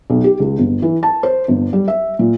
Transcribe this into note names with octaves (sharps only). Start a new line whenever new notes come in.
B1
G4
C#2
G1
E3
A5
C5
G1
G3
E5
A#2